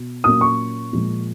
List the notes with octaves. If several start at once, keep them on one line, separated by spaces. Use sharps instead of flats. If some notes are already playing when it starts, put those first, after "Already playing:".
Already playing: B2
A#2 F#3 A#3 C#4 D#6
C#6
A#2 F3 G#3